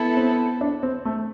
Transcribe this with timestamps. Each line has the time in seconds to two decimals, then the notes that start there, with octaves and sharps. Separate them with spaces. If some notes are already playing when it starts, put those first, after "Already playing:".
Already playing: B3 E4 A4
0.17 C4
0.61 D4
0.83 C4
1.05 A3